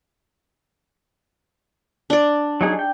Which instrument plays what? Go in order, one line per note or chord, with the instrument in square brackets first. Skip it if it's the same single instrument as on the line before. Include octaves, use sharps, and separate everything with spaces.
[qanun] D4 D5
[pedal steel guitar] F#3 D#4 G#4
G5